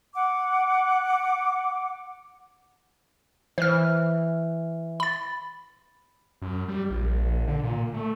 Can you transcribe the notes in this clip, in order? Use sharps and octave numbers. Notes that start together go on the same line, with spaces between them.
F#5 D6
E3 C5 F6
B5 A6
F#2
G3
A#1
D3
A#2
A3